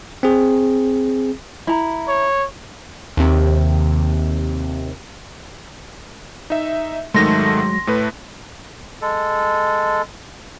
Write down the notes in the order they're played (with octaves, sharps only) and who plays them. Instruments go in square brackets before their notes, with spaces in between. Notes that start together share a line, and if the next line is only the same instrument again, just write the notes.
[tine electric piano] C4 G#4
[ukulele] E4 A#5
[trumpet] C#5
[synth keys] D#2 C3
[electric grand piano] D#4 E5
[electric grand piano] G#2 D#3 A3 [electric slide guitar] F#3 G#3 [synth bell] C6 A#6
[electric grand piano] A2 A3 B4
[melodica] G#3 A4